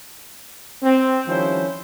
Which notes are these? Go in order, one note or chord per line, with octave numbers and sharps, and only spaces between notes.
C4
D#3 F3 G3 C#4 E4 C5